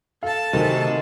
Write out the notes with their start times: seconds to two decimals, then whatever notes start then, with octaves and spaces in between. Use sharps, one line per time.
0.23 A4 F5 A5
0.53 D2 C3 D#3 D#4 G#4